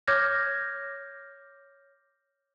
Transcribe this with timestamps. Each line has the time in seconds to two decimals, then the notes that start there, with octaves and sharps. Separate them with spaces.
0.08 C#5 D6 F6 G6 G#6 A#6